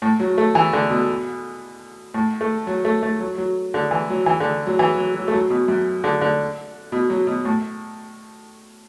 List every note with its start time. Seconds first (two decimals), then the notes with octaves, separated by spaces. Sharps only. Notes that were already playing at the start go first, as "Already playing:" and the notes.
0.02 A2
0.20 F#3
0.38 A3
0.55 E3
0.73 D3
0.90 B2
2.14 A2
2.41 A3
2.67 F#3
2.85 A3
3.03 A3
3.20 F#3
3.38 F#3
3.74 D3
3.91 E3
4.10 F#3
4.26 E3
4.40 D3
4.67 F#3
4.79 E3
4.97 F#3
5.15 F#3
5.28 A3
5.33 F#3
5.50 B2
5.68 F#2
6.04 D3
6.21 D3
6.92 B2
7.10 F#3
7.27 B2
7.45 A2